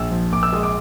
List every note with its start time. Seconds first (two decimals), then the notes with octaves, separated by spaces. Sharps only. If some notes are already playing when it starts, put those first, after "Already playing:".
Already playing: A#1 E6
0.11 F3
0.32 A#2 D6
0.43 E6
0.53 G#3 D#6
0.63 D6